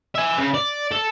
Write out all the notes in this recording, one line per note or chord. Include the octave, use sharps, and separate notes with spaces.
E5 G#5
C#3
D5
A4